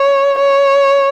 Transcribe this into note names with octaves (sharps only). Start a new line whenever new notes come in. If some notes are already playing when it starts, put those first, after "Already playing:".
Already playing: C#5
C#5